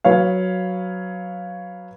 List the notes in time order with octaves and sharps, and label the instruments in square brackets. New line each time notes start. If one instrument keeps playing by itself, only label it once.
[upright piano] F#3 B4 C#5 F5